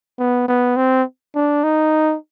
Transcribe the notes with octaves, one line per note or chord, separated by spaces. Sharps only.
B3
B3
C4
D4
D#4